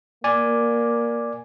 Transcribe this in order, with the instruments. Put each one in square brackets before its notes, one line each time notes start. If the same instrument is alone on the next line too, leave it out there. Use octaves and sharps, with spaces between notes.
[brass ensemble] A#3 [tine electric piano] D5 G#5